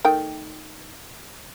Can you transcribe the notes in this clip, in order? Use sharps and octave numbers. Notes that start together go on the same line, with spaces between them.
D#3 A3 G5